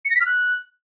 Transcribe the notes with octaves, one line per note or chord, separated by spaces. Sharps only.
C#7
A#6
B6
F6
F#6